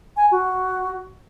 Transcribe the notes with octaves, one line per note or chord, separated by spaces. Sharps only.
G#5
F#4